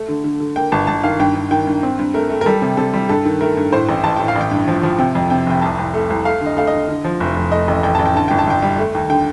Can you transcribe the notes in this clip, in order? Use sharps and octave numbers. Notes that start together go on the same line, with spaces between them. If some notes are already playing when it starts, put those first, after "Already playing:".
Already playing: A3
D3
D3
D3
A#3 G5
G1 A5
G1 A5
D#3 F5
G2 G5
G2
D#3 G5
G2
C4
G2
A3 A#4
A3
A#4
G3 A4
C3
C3 A4
G3
G2 A4
D#3
A3 A#4
G2
A2 C5
A1
A1 A5
A2 G5
F5
A1
G5
G2
F3
F3
C3 G5
F2
C3 G5
F1 G5
C2 A5
C2
A3
C2
A3 F5
D3
D#5
A3 F5
D#5
D3
D3
F3
F1
F1
A3 D#5
A1
A1 G5
A1 A5
G5
D3 A5
G1 G5
A5
G1 G5
G3
A3
D#2
D3 G5